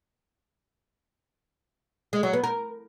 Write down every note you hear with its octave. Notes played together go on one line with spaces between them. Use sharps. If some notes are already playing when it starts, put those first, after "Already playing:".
G#3
F#3
B3
A#4